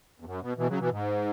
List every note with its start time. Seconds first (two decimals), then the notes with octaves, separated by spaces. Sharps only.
0.20 E2
0.25 F#2
0.41 B2
0.57 B2 E3
0.69 C#3 F#3
0.79 B2 E3
0.91 G#2